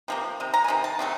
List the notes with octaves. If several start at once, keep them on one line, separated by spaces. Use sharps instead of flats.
C3 F3 A#3
C3 D#3
A#5
G#5
C3 D#3
A5
C3 D#3 F#3 A3